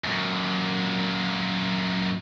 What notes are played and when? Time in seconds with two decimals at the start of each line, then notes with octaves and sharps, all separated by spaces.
0.04 F#2 A#2